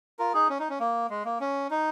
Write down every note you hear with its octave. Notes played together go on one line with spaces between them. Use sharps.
F4 A#4
D#4 G#4
C#4
D#4
C#4
A#3
G#3
A#3
C#4
D#4